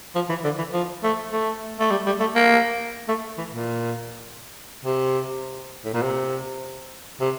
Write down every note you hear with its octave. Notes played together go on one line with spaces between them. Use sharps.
F3
E3
D3
E3
F3
A3
A3
A3
G3
G3
A3
A#3
A3
E3
A#2
C3
A2
A#2
C3
C3